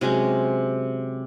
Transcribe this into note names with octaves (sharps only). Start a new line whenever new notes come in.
C3 F#3 G#3 C#4